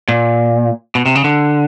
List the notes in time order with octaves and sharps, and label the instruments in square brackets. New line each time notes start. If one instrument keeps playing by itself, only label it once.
[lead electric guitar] A#2
B2
C3
C#3
D3